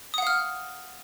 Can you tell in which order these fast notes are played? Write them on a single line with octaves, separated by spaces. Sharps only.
D#6 F#5 F5 F6